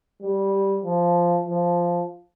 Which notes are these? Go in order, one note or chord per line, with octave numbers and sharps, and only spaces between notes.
G3
F3
F3